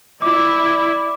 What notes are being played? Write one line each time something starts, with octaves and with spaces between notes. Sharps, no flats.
E4 D5 E5 D6